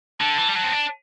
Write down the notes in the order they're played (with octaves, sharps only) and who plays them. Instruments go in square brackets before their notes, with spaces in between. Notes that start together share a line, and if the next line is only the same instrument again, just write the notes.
[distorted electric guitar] D3 [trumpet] A5
[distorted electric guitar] E3
G3
[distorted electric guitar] F#3 [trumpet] A5
[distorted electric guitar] C4
D4